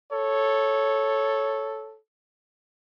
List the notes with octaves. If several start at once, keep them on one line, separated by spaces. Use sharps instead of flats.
A4 C#5